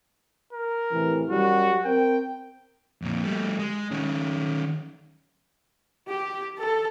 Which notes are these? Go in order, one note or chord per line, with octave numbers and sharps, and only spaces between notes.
A#4
A2 C3 E3
F#2 F#3 G3 F#4
C4 A#4 G5
F2 A#2
G3 A3
G#3
D#3 C#4
G4
A4